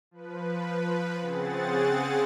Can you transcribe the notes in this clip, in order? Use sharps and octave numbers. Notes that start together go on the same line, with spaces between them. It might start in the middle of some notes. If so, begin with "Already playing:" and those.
F3 B4
C#3 C4 G#4 F#5 A6